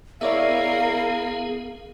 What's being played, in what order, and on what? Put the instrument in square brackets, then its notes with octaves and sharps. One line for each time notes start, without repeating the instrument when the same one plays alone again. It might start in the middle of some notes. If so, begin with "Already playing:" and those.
[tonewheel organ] B3 G#4 [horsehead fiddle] E4 A#4 [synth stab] C#5 D5 E5 [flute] F5